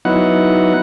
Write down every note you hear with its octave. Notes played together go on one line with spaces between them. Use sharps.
F#3 B3 D#4 E4 F#5